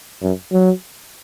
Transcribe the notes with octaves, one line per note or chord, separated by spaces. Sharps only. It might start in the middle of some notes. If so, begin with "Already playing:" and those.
F#2
F#3